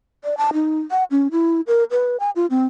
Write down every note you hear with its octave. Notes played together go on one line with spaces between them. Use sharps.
D5
A5
D#4
F#5
C#4
E4
A#4
B4
G#5
F4
C4